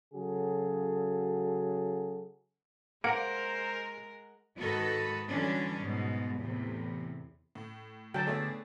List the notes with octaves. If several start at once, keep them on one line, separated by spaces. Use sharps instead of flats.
C#3 F#3 F#4 G#4 A4
G#3 A#3 A#4 C5 F#5 C#7 D7
G#2 D#3 F#4 A4 B4 D#5
D3 E3 F#3 G3 C#4 D4
G#2 B2
E2 A2 C3
A2
D3 F#3 G5 A5
A3 B3 G#4 C#5 D5 E5